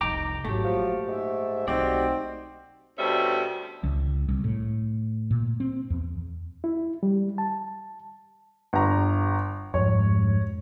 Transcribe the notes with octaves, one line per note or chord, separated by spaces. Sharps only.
F1 C2 D#4 G5 A#5 D6
G#1 F#3 A3 G4
A#2 F3
G#2 E5
B1 A3 C4 D#4 F#4 G4 D5
D2 B2 G3 C#4 C5 E5
C#2
C2
A2
A#2
C4
E2
E4
G3
A5
G1 A#5
F2 G#2 C#5